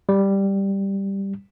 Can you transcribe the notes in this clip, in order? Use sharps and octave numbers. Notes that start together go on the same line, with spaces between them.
G3